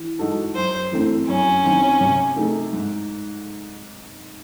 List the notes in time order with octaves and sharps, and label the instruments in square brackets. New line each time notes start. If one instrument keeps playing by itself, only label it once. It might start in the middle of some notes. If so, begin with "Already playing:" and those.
Already playing: [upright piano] E3
G#3 D#4 F#4 A4
[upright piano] F#2 [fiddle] C5
[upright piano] E3 A3 C4
[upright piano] F#2 [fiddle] C#4
[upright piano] D#3 F#3 C4
C3
F#3 A3 D#4 G#4
G#2